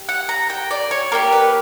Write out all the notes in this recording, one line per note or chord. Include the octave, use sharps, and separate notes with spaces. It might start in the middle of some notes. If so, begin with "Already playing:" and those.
Already playing: G4
F#5
A#5
G5
D5
C#5
A#3 D4 G4 A#4
B4